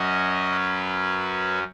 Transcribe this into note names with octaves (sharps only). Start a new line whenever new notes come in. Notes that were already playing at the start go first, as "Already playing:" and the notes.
Already playing: F#2 F#3 C#4 D#5
B4